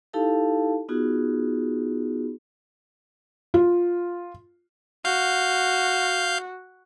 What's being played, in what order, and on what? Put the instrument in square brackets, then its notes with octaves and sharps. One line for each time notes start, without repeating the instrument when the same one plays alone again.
[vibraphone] D#4 E4 G4 A4 F5 A5
B3 D#4 F4 F#4 G#4
[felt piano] F4
[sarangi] F#4 [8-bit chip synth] F5 G6